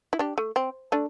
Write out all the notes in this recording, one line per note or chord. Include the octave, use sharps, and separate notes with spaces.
E4
D4 G4
A3
C4
A3 D4